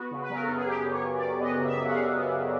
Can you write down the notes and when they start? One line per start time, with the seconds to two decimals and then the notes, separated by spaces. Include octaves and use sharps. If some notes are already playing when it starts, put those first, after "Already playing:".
Already playing: B3 F#4
0.11 C#3
0.21 B4
0.30 F#3 A#4
0.43 F#2 A4
0.55 G#4
0.66 B3 G4
0.85 C#3
0.91 C#5
1.04 F#3
1.16 D5
1.22 F#2
1.40 B3 D#5
1.59 C#3
1.65 E5
1.77 F#3
1.86 F#5
1.90 F5
1.97 F#2
2.14 B3
2.33 C#3